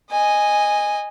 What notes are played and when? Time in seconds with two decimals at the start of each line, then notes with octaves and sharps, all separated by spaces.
0.11 D#5 G#5